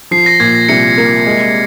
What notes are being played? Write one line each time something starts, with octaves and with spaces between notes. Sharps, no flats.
F3 C7
A#6
A#2 G#6
A#6
C2 C#7
A#3
G#3